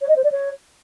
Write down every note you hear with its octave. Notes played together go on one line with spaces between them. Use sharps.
C#5
D#5
C5
D5
C#5